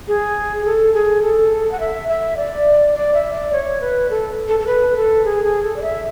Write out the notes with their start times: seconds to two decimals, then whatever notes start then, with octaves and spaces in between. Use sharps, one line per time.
0.08 G#4
0.65 A4
0.94 G#4
1.22 A4
1.71 F#5
1.80 E5
2.08 E5
2.37 D5
2.95 D5
3.14 E5
3.33 D5
3.53 C#5
3.81 B4
4.10 A4
4.48 A4
4.60 A4
4.67 B4
4.96 A4
5.25 G#4
5.44 G#4
5.63 A4
5.76 D5
5.82 E5